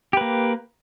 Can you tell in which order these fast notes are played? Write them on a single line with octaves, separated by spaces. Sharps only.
G4 B4 A#3